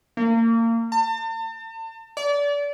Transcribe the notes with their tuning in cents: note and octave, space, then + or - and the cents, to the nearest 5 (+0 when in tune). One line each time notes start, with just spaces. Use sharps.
A#3 -30
A5 +40
D5 -30